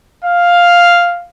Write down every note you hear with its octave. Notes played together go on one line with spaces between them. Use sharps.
F5